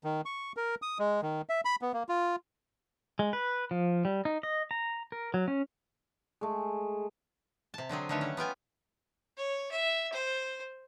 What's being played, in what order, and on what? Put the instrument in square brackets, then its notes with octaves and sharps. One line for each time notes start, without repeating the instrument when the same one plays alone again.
[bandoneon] D#3
C#6
A#4
D#6
G#3
D#3
E5
B5
B3
A#3
F4
[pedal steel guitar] G#3
B4
F3
G3
D#4
D#5
A#5
A#4
F#3
C#4
[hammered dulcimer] G#3 A3
[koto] C3 A5
D3 F#3 C4 G#4
D3 D#3 A3 B4 C#5
C#4
B3 F4 G5 G#5
[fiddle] C#5
E5
C5